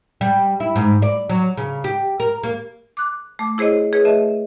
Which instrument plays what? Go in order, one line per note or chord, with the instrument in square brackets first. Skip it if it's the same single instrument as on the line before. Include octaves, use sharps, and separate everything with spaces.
[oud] G3
E4
G#2
D5
F#3
C#3
G4
A#4
A#3
[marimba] D6 F#6
A3 D6
E4 G#4 C5 C#5 D#5
G#4 B4 C#5
A3 D#5 E5